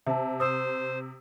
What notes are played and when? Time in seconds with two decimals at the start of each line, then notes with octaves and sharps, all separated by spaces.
0.07 C3 E5 A5
0.40 C5 D#6 E6